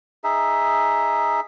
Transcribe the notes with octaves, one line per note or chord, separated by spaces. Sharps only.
D#4 G#4 E5